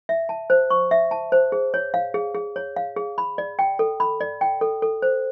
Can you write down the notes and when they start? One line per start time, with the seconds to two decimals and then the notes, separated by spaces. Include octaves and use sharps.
0.09 E5
0.29 A5
0.50 C5
0.70 C#6
0.91 E5
1.11 A5
1.32 C5
1.52 G#4
1.74 C#5
1.94 F5
2.14 G#4
2.35 G#4
2.56 C#5
2.76 F5
2.96 G#4
3.18 B5
3.38 D5
3.59 G5
3.79 A4
4.00 B5
4.21 D5
4.41 G5
4.61 A4
4.82 A4
5.02 C5